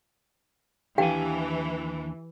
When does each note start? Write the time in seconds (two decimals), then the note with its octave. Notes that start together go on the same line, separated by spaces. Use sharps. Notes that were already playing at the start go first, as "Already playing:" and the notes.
0.98 D#2 E3 D4 G4 F5 G5 G#5